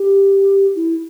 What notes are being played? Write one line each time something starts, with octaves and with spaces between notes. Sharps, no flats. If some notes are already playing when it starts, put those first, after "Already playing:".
Already playing: G4
E4